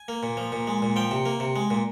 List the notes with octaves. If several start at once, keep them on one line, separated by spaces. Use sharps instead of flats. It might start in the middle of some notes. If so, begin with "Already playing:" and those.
Already playing: G#5
A#3
A#2
F3
A#2
G#3
A#2
F3 G5
C3
A#3
C3
G#3
A#2